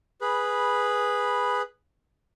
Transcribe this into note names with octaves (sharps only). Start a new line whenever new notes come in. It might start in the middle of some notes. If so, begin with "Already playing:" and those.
G#4 B4 B5